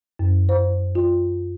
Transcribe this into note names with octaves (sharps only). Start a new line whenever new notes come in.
F#2
C5
F4